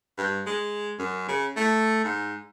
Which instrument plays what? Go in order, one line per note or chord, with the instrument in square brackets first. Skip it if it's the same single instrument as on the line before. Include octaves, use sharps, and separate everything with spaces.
[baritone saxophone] G2
G#3
F#2
C#3
A3
G#2